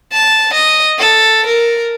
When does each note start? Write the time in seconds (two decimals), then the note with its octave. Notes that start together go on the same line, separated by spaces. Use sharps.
0.12 A5
0.53 D#5
0.98 A4
1.46 A#4